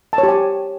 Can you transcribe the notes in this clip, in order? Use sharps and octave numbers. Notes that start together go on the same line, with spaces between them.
A5
C#5
G4
G#5